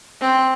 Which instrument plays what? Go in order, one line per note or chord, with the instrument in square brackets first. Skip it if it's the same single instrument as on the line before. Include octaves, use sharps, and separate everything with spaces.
[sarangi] C4